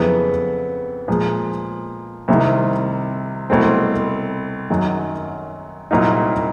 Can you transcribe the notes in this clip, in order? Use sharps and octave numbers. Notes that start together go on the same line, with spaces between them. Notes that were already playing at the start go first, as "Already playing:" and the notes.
Already playing: F2 C#3 F#3 B3 E4
A#2 F3 G#3
C2 C3 D#3
C2 B2 F#3 A3 C4
F#2 D#3 F#3
C2 A#2 F#3 A#3 D#4